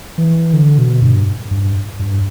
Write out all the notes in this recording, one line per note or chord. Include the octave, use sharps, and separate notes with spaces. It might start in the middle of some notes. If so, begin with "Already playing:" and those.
E3
D3
B2
G2
G2
G2